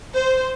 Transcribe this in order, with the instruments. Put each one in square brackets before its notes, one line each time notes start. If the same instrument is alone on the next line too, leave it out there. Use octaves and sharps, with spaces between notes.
[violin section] C5